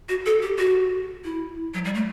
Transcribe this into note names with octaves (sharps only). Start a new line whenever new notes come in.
F#4
A4
G4
F#4
E4
F#3
G3
A3